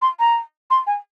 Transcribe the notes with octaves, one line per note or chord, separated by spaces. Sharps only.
C6
A#5
C6
G#5